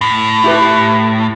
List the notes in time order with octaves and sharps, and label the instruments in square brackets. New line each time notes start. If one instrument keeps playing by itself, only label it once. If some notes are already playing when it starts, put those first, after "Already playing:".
[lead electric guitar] A2
[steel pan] E4 G4 B4